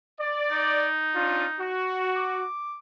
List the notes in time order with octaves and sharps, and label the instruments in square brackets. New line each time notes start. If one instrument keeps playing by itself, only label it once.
[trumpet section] D5
[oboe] D#4
[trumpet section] C#4 D4 F4
F#4
[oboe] D6